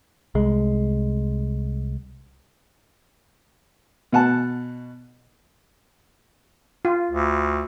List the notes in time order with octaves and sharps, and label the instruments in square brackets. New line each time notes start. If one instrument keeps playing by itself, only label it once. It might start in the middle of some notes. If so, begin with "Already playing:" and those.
[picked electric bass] C2 G#3
[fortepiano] B2 F#5 A5
[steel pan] F4
[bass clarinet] D2